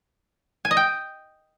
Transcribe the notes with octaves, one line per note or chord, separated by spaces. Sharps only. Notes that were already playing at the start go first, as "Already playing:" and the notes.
G#5
D#5
G5